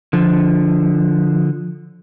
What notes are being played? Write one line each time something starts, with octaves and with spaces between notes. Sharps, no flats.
D3 F3